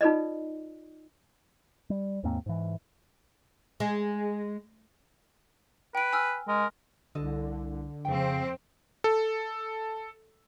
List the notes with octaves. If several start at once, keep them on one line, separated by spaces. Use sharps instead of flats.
D#4 F4 A4 B4 D5 D#5
G3
D#2 G#2 A#3 C4
G#2 E3
G#3
B4 G5 D7
G#5 E6 F6
G#3 A#4
C2 D3 A4 D#5
F2 C#3 C4 G5
A4